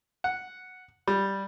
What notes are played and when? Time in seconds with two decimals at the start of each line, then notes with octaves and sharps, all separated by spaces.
0.24 F#5
1.08 G3